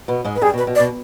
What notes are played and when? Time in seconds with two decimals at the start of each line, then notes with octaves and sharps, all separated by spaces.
0.08 B2 B3
0.25 G#2 G#3
0.36 B4
0.41 G2 G3 G#4
0.54 B2
0.58 B4
0.67 B2
0.75 D5
0.79 B2